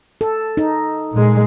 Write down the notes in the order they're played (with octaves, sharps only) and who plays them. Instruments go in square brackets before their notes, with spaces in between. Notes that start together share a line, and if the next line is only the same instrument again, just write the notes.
[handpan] A4
D#4
[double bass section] A#2 G#3